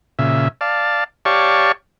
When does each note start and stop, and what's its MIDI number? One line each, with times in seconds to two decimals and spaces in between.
0.19 0.48 46
0.19 0.48 49
0.19 0.48 76
0.61 1.04 74
0.61 1.04 77
0.61 1.04 81
1.25 1.72 67
1.25 1.72 73
1.25 1.72 74
1.25 1.72 77
1.25 1.72 81
1.25 1.72 85